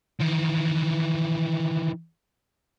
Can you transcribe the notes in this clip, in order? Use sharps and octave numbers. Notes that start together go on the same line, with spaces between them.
D#3 E3